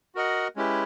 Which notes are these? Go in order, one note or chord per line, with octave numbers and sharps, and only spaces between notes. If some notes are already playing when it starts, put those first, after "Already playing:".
F#4 A#4 D#5 F#5
G#3 C#4 E4 G4 B4